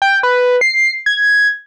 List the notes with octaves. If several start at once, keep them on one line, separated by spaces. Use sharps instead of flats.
G5
B4
C7
G#6